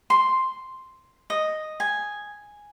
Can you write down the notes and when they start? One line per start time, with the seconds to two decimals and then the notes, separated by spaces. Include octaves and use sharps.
0.10 C6
1.30 D#5
1.80 G#5